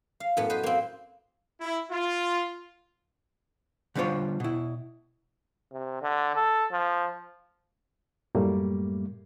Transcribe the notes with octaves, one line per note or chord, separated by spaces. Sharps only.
F5
F#2 A2 B3
B4 C5 D#5
A#3 C4
E4
F4
D3 G3 D4 F4 C5 C#5
B2 E4
C3
D3
A4
F3
F#2 A2 G3 A3 A#3